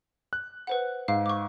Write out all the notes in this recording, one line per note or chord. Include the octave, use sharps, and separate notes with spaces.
F#6
B4 C5 F#5
G#2 F5
C#6 D6